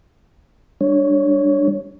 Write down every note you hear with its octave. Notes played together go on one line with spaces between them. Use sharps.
G3 D4 C#5